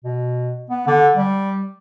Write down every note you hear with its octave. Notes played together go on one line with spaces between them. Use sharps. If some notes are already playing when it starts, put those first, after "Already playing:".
B2
B3
D3
G3